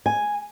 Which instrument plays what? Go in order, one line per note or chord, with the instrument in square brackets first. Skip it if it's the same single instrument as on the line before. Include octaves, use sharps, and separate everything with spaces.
[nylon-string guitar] G#5